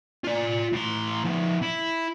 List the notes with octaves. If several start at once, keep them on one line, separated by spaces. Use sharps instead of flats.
F4 D5
A2 C6
F3 B3
E4